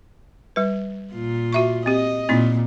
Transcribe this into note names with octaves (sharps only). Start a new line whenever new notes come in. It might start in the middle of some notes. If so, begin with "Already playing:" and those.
G3 B4
A#2 F4
F#4 E5 C#6
C4 G4 D#5
A#2 C4 D#4 E4